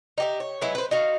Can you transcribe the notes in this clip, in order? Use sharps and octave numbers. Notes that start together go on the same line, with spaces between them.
D#4 G4 E5
C#5
F#3 G#3 B3 E4
B4 C5
D#4 F#4 F5